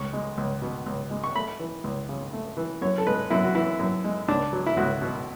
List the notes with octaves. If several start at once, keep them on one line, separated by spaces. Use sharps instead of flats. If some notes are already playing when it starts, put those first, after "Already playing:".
Already playing: C#2 C#6
G#3
C#2
B2
C#2
G#3
C#6
A3 B5
E3
C#2
C#3
A3
E3
F#2 C#5
A4
G#3 B4
F#2 E4
F#4
E3 E4
F#2
G#3
C#2 D4
F#3
E4
C#2 F#4
B2